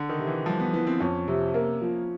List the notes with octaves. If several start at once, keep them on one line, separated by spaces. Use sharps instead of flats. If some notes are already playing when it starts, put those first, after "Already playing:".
Already playing: D3
D#3
C3
E3
F3 G3
B3
E3 B3
C4
F2 C#4
C3
A#3
F3